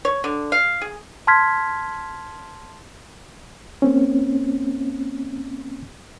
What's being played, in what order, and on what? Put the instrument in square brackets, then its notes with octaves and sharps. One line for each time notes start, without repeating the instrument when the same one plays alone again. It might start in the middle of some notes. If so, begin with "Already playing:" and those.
[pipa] C#5
D3
F5
G#4
[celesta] A5 C6 F6 G#6 B6
[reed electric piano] A#3 C4 C#4